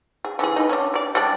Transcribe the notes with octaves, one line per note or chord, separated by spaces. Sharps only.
G#4
D3 E3 G#4
D#4 B4
C#4 D4
G4 D5
G3 G#3 D4